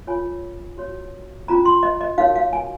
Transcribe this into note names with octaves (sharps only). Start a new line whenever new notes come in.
F4 A#4 C#5 G#5
F#4 C#5
C#4 F4 C5 A#5
C6
D#5
D#5
D#4 F#4 A#4 C#5 F5
F5
G#5